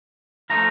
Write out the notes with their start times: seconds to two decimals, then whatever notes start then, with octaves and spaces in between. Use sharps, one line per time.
0.50 F3 A3 D#4 A#5